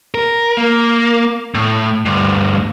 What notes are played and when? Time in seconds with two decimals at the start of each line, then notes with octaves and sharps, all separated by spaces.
0.15 A#4
0.57 A#3
1.55 A2
2.05 D2 G2